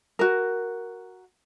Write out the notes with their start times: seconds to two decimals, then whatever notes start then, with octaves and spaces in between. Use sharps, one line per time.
0.19 F#4 A#4